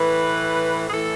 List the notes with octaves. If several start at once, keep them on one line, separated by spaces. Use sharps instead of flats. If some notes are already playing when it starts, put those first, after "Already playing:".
Already playing: A2 E3 B4
G#4
A2 E3 A4